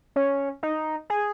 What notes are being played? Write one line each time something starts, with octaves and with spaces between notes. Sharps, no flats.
C#4
D#4
G#4